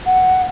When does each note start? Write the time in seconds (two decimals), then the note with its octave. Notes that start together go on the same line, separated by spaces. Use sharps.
0.06 F#5